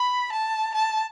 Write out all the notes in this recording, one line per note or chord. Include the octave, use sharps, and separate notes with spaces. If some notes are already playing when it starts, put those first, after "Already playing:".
Already playing: B5
A5
A5